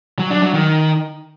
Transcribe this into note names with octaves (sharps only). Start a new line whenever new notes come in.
F#3
D4
F#3
D#3